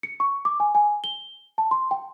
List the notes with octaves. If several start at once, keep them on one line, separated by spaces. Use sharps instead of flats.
C#7
C#6
D6
G#5
G#5
G7
A5
C6
G5